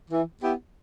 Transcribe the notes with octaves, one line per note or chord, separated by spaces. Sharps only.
E3
B3 E4 G4